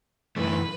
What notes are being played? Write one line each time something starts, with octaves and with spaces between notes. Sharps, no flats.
F#2 E3 A3 B4